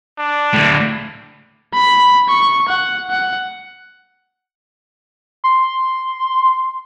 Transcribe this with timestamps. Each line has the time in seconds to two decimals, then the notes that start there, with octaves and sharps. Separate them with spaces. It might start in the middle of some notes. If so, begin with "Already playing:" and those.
0.19 D4
0.53 D2 A2
1.74 B5
2.29 C#6
2.69 F#5
3.10 F#5
5.44 C6